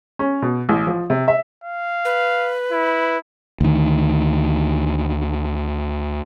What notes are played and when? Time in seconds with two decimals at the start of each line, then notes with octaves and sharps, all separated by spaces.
0.19 C#4
0.42 B2
0.69 A1
0.87 F3
1.10 C3
1.28 E5
1.64 F5
2.05 B4
2.72 E4
3.61 D2 D#3